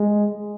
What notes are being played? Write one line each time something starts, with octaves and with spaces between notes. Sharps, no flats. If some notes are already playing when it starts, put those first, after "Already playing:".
Already playing: G#3